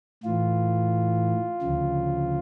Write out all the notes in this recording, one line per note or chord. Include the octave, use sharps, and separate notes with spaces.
A2 E3 F4
D2 C#3 F3